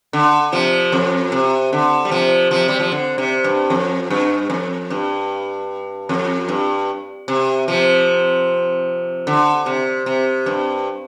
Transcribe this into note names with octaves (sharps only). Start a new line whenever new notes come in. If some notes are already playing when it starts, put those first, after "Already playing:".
D3
C3 F3
F2
C3
D3
G3
C3 F3
C3 F3
G3
F3
D3
C3
G2
F2
G2
F2
G2
F2
G2
C3
C3 F3
D3
C3
C3
G2